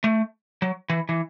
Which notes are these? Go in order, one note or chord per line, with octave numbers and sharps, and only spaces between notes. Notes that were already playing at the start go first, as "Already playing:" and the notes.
A3
F#3
E3
E3